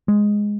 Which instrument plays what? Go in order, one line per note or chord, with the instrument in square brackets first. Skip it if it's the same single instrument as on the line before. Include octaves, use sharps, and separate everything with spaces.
[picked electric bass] G#3